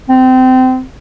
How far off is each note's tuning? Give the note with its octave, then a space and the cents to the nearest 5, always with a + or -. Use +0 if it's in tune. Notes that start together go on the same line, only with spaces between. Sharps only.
C4 -25